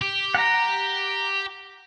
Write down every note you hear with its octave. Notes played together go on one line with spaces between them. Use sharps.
G4
F#5 A#5